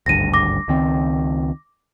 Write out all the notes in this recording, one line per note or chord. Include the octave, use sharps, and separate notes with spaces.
G#1 D2 G2 A#6 D#7
D6 A#6
C#2 D#3 C4